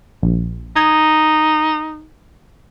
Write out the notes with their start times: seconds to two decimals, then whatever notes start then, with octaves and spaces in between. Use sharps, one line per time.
0.23 A#1
0.76 D#4 D#6 G#6